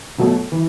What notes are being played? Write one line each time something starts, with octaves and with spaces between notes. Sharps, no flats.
B2 F#3 A3
E3